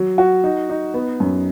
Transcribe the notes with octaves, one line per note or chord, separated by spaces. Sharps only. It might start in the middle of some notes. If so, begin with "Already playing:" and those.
Already playing: F#3
F#4
D#4
D#4
B3
F#2